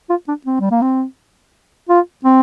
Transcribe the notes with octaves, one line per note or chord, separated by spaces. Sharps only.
F4
D4
C4
G3
A#3
C4
F4
C4